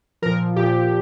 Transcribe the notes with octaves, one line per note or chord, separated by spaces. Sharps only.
A#2 F3 A#4
A#2 F3 G4